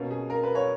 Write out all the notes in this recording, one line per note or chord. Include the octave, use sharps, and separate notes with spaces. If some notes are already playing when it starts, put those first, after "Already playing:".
Already playing: B2 A#3 C#4
G#4
A#4
B4
C#5